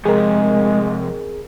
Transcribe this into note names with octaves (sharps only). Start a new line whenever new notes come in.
F2 C3 G#3 G#4 A#4